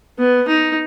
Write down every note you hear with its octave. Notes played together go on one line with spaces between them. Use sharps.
B3
D#4